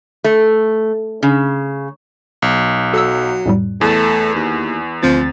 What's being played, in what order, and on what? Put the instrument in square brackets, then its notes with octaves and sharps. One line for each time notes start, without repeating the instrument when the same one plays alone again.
[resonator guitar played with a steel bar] A3
C#3
[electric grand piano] B1
[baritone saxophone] F#3 [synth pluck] A4 E6
[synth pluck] F2 A2 G3
[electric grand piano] E2 [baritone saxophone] A3
[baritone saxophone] D#2
[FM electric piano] D2 C4 A6 [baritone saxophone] F3